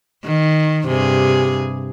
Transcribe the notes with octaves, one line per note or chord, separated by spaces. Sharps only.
D#3
G2 C3 G#4